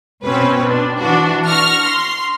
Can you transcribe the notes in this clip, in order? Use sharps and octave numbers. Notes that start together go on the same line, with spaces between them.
B2 C4 C#4 B4
D4
E3 D4 F#4
C#6 F6 A#6
C6